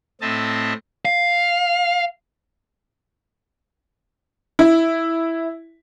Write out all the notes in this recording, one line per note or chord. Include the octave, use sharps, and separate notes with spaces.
A2 C4 D#5 E5 A5
F5
E4